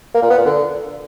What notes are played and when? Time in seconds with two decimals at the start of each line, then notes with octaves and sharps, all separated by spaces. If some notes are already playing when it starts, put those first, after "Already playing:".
0.14 A#3
0.22 A#2
0.30 B3
0.38 A#2
0.46 D3